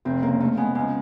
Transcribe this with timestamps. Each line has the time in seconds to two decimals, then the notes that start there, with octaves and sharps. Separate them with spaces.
0.05 F1 C4
0.22 C#3 A#3
0.40 C#3 A3
0.57 G#3 B3
0.75 C#2 G#3